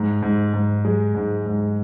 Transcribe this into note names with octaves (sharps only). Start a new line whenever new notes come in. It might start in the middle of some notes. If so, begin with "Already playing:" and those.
Already playing: G#2
G#2
G#2
G#3
G#2
G#2